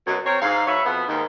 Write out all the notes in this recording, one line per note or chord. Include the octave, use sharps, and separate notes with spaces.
F#2 B2
C4 A#4 C5 C#5
G#2 F5
F#3 B4 C#5 E5
F2 B2 B3
D#2 G#2 D#3